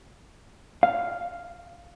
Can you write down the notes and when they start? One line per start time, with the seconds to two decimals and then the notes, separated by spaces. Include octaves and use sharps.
0.83 F5